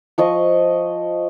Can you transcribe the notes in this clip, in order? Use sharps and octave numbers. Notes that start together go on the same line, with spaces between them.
F3 D#5 C#6